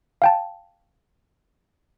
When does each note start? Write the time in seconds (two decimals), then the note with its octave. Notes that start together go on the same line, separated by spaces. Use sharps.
0.22 F5 G5 A5